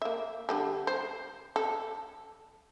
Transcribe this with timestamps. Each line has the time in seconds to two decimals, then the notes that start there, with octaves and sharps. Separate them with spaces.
0.02 A#3 E5
0.49 D3 G3 A4
0.87 C5
1.56 A4